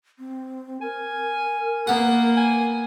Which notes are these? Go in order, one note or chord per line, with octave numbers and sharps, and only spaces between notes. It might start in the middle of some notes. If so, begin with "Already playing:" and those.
C4
A#4 G#5
A#3 B3 F#5
G#5